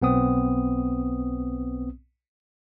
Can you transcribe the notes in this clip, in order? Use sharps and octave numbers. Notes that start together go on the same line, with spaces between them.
B1 B3 C4 D#6